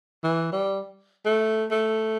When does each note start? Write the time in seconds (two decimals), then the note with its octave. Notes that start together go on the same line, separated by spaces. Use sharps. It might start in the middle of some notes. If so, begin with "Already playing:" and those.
0.24 E3
0.53 G3
1.26 A3
1.71 A3